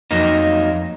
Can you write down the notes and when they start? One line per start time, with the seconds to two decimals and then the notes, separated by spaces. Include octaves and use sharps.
0.11 F2 F#3 A#3 D#4